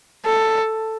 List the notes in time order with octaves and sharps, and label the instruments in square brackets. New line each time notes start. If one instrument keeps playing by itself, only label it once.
[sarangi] A4